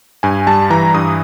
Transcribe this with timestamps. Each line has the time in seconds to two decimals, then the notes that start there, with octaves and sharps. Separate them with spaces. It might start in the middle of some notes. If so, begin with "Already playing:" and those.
0.23 G2 G#5
0.47 G3 A5
0.70 E3 A#5
0.94 G2 D#6